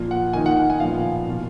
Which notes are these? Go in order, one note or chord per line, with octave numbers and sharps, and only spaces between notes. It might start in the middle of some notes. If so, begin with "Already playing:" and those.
Already playing: A#2 F3 A#3 F4
F#5
D#3 A#3 D#4 G#5
F#5
F#5
G#5
A#2 F3 B3 F4 F5
B2 A#3 F4